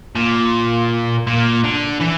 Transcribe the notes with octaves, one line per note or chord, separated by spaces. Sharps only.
A#2
A#2
D3
E3